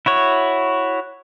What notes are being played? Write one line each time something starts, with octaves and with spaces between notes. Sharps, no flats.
E4 F#4 C#5